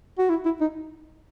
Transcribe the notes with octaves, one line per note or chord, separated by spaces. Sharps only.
F#4
E4
E4
D#4